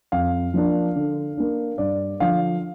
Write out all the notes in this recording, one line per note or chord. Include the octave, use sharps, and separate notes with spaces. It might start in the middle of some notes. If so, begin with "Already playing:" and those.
F2 F5
F3 A#3 D4
D3
A#3 D4
G2 D5
D3 F3 F5